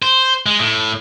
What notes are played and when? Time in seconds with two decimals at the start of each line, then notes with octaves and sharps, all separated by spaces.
0.02 C5
0.46 G#3
0.59 A2